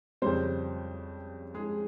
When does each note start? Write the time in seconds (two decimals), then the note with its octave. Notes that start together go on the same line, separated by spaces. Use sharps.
0.22 F2 C#3 G3 C4 C5
1.54 G#3 G#4